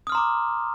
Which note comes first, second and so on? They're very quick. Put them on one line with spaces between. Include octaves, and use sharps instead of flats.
D#6 F6 C6 A#5 D6